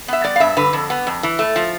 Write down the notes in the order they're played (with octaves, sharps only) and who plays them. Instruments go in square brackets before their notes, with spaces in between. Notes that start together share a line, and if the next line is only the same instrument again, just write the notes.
[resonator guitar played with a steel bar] B3 E5
G3 D5
F5
G2 E5
D3 B4
F2
B3
F2
E3
A3
F3